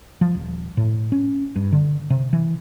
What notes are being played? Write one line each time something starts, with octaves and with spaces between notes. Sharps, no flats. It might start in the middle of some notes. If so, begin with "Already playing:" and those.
F3
D#1
A2
C#4
G2
D3
C3
E3